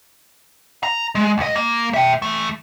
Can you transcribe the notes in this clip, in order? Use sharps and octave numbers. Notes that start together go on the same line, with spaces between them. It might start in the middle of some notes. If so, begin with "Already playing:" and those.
A#5
G#3
C#2 D#5
A#3
E5 G5
E3 A3